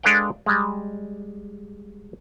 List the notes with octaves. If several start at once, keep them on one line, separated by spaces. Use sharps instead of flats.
G#3 D4 A4 B4 F5 G5
G3 G#3